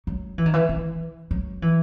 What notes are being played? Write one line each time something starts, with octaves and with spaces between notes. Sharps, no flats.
F#3
E3
D#3
E3
E3
F#3
E3